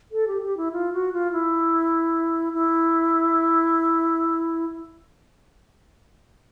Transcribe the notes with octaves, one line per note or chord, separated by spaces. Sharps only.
A4
G4
G4
E4
F4
F#4
F4
E4
E4